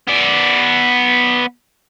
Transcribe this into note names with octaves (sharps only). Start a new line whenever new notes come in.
B3 D5